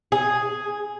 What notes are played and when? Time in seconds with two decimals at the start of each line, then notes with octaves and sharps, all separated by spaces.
0.12 G#4